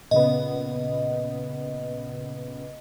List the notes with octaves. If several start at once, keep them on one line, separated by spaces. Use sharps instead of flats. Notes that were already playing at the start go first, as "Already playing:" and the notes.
A#2 C#3 B3 D#5